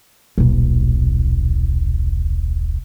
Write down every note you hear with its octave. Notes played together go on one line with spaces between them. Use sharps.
D#1 B1